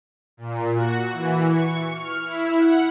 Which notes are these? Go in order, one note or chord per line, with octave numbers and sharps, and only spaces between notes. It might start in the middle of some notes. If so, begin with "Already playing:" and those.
A#2
F#4
E3
C#6
F6
E4
F#5